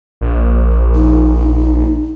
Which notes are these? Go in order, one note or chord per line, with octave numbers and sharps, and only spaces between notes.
A#1
D#4